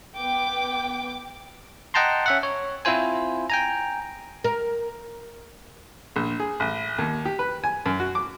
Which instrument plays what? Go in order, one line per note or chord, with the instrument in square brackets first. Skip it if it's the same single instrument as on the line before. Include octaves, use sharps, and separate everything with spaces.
[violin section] B3 G5 D6
[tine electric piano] D#5 F#5 G5 A5 A#5 C6
C#4 E5 F#5
C#5
C4 E4 F4 C5 G#5
G5 G#5 A#5
[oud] A#4
[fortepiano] A#1
G#4
A1
D#2
G4
B4
G#5
F#2
F#4
D6